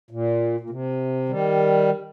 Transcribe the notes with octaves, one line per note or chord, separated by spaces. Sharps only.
A#2
A#2
C3
D#3 G3